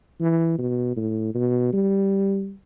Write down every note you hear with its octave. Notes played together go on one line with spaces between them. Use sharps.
E3
B2
A2
B2
G3